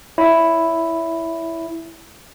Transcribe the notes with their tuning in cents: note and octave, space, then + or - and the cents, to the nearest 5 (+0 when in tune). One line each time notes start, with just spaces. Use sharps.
E4 +0 C#5 +30